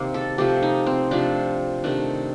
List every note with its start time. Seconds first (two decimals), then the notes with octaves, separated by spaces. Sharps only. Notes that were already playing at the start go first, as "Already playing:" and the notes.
Already playing: C3 D#3 A#3 G4
0.14 A4
0.38 C3 F3 A3 G4
0.62 D#4
0.86 C4
1.11 C3 F3 A3 D4
1.84 C3 D#3 A3 D4